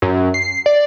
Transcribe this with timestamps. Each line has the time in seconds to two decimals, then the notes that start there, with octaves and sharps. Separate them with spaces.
0.02 F#2
0.34 C7
0.66 D5